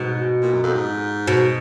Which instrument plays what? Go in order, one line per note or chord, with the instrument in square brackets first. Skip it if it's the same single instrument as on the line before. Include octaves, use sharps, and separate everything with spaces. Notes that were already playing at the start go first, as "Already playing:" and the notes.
Already playing: [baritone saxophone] G#2 [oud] B2
[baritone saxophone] A#2
F#2
F2
G#2
[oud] B2